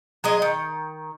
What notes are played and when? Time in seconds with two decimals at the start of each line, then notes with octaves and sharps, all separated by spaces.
0.24 F#3 G#3 D#5
0.42 D#3